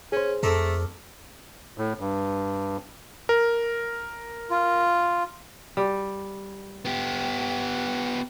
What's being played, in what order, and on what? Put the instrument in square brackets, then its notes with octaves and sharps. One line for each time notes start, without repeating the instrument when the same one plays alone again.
[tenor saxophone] C#4 [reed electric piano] G#4 C5
[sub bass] F2 [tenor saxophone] A3 [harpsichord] A4 A#4 D5
[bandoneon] A2
G2
[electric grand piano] A#4
[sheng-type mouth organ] F4
[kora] G3
[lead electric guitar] B3 G4